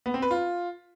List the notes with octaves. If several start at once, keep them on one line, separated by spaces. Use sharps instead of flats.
B3
C4
B4
F4